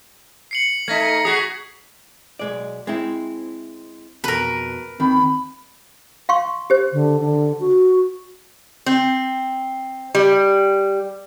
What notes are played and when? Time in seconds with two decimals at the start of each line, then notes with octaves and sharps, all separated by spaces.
0.51 C7 C#7 F#7
0.88 A3 D#4 G#6 A#6 B6
1.25 F#4 G#4 D#6 C7
2.39 B1 G#3 D5
2.87 G#3 C4 E4
4.24 F2 B2 A#4 B4
5.00 D#2 D#3 C4 B5
6.29 F5 C6 C#6
6.70 G4 C5
6.93 D3
7.20 D3
7.60 F#4
8.86 C4
10.15 G3